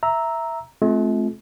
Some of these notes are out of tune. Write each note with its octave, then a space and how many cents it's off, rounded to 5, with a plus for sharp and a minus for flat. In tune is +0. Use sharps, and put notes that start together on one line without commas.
E5 +0 A#5 +0 E6 -10
A3 -45 C4 +0 F4 +0